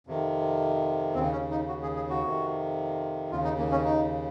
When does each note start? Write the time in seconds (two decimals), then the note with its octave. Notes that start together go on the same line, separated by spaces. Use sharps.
0.07 F2 C3 D#3
1.14 D#2 C#3 C4
1.32 C#4
1.51 D#4
1.68 F#4
1.83 G#4
1.96 G#4
2.09 F#4
2.23 F2 C3 D#3
3.31 D#2 C#3 F4
3.44 D#4
3.59 A#3
3.71 C#4
3.85 D#4